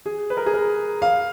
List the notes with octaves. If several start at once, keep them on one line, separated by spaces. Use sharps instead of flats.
G#4
B4
A#4
G#4
A#4
F5